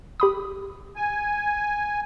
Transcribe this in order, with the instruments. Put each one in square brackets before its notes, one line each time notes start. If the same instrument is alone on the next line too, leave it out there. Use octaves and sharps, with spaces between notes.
[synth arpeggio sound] G4 B5 D#6
[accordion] G#5